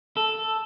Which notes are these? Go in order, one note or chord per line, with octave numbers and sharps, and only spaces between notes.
A4